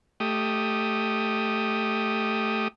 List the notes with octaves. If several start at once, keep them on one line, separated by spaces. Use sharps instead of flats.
A3 G4 D#6